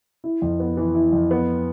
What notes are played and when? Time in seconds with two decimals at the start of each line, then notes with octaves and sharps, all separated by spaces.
0.24 E4
0.42 F2
0.60 B3
0.77 E3
0.95 E4
1.13 F2
1.31 B3